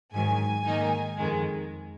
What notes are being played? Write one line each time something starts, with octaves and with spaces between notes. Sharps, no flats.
G#2 D#3 F#3 G#5
G#2 D#3 A#3 D#4
F2 D#3 G#3